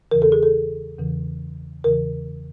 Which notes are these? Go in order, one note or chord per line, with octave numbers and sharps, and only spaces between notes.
E2 C#3 E3 A#4
A4
G#4
A4
E2 C#3 E3
E2 C#3 E3 A#4